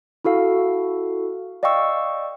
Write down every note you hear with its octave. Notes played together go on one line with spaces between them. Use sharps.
E4 F#4 A4 F5
D5 D#5 F5 G5 C#6 E6